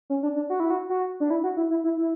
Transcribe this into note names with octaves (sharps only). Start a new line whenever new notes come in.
C#4
D4
D4
F#4
E4
F#4
F#4
D4
E4
F#4
E4
E4
E4
E4